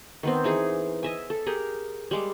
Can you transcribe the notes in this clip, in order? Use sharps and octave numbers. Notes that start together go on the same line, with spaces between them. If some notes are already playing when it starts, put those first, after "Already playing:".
D#3 B3 C4
E3 D#4 G#4
D#5 E5 G#5
A4
G4 G#4 A#4
G3 G#3 D6